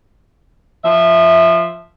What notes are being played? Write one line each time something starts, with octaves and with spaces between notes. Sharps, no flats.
F3 E5